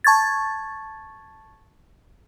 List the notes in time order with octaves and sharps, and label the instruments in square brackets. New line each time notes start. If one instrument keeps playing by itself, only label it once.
[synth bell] A5 C#6 G#6 A6